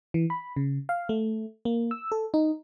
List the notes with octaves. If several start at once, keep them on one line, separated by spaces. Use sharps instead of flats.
E3
B5
C#3
F5
A3
A#3
E6
A4
D#4